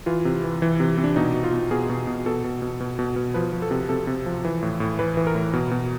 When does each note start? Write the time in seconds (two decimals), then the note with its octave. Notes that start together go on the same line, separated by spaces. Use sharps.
0.06 E3 F4
0.25 C3
0.44 E3
0.62 E3
0.80 C3
0.98 C3
1.04 D4
1.16 B2 D#4
1.34 B2
1.44 F4
1.53 B2
1.71 B2 G#4
1.90 B2
2.07 B2
2.26 B2 A4
2.44 B2
2.62 B2
2.80 B2
2.99 B2
3.16 B2
3.34 F3 B4
3.53 F3
3.62 A4
3.71 C3
3.89 C3 A4
4.07 C3
4.26 F3
4.45 E3
4.63 A2
4.80 A2
4.99 E3 B4
5.17 E3
5.27 A#4
5.35 A2
5.53 B2
5.71 B2